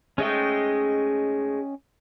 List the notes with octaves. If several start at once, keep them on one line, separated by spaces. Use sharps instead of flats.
G#2 G#3 A3 C#4 D#5 G5